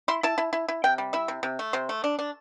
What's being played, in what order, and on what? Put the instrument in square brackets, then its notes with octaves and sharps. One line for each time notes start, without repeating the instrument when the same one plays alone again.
[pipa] E4 C6
E4 A5
E4
E4
E4
C3 G5
G3
E4 E5
C3
C3
A3
C3 C5
A3
D4
D4